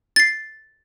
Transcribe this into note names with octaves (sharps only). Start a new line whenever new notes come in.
A6 C7